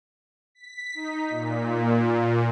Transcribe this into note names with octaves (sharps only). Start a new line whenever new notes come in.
B6
D#4
A#2